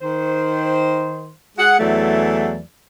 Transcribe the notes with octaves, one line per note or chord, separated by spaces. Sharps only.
D#3 C5
G#3 G#4 F#5
E2 E3 F#3 A3 D5